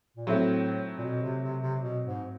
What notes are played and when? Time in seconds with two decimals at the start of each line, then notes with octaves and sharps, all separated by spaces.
0.17 A#2
0.27 A2 F#3 A3 C4 E4
0.98 A#2
1.04 B2
1.22 C3
1.43 C3
1.61 C3
1.81 B2
2.05 G#2